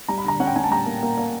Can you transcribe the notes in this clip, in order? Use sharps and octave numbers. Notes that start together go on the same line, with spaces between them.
G3 A#5
B5
D3 A#5
C#4 F#5
G5
C#4 G#5
A5
G3 A#5
A#3
A#3
A#3